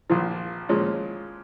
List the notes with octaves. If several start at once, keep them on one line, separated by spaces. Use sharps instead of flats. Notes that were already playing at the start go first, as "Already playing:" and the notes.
A#1 A#2 F3
A#2 F3 G#3 C#4